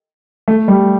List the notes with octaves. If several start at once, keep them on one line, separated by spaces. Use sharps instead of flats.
A3
G3